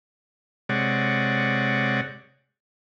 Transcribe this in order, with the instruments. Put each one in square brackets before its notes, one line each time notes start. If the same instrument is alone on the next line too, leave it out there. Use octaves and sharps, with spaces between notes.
[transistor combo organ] C3 G#3 C#5 D5 F#5